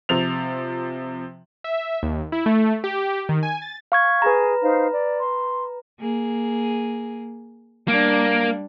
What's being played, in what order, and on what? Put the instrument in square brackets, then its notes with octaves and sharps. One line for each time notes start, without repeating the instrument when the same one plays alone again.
[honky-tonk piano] C3 F3 F7
[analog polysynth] E5
D#2
E4
A3
G4
D#3
G#5
A6
[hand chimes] F5 C#6 G#6
[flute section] G#4 [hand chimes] B4 A#5
[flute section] D#4 C5 F5
D5
C6
[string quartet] A#3 G#4
[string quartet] G3 D4 [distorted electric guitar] A#3